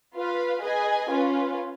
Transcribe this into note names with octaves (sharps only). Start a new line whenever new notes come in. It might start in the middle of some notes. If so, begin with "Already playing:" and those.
F4 B4 F5
G#4 B4 D#5 G#5
C#4 F4 B4